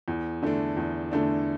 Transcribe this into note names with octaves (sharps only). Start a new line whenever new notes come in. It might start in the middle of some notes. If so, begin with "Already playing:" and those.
E2
D3 A3 D4
E2
D3 A3 D4